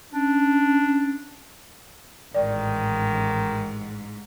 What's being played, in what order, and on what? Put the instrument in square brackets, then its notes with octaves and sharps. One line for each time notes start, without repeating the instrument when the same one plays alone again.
[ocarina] C#4 [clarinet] D4
[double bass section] A1 [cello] G#2 [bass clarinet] D#3 [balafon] D5